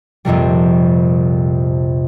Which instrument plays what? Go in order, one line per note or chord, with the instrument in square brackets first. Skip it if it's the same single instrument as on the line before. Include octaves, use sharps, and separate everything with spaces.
[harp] A#1 F2 C3 G3